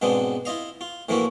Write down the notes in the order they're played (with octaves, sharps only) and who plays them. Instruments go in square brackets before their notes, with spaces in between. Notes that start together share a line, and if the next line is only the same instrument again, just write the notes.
[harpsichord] G#2 B2 G#3 B3 C4 D4
E4 F4 D#5 F5
F4
A2 E3 F3 A#3 E4 F#4